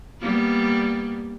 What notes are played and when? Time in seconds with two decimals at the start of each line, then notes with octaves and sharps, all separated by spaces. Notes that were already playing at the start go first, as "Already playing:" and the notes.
0.21 G3 A#3 B3